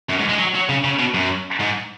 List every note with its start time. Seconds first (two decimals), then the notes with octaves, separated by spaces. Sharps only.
0.10 F#2
0.20 G#2
0.29 G#3
0.39 F#3
0.55 F#3
0.69 C#3
0.84 C#3
0.99 B2
1.14 F#2
1.60 G#2